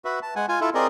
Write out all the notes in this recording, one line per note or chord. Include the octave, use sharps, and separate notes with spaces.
F#4 B4 E5
A5
G#3 F#5 G#5
F4 G#5
E4 F4 A4
C4 G#4 A#4 D5 D#5